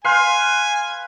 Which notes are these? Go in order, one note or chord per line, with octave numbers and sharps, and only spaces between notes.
B4 F5 G#5 C6